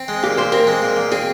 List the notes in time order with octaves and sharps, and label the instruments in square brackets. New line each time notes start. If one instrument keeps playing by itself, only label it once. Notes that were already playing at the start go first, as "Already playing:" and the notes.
Already playing: [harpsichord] C4
G#3
[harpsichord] A#2 [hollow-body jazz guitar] G4
[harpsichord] A#2 [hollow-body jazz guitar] C5
[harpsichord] C4 [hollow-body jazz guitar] A#4
[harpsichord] G#3
A#2
A#2
[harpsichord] C4 [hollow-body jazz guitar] G#4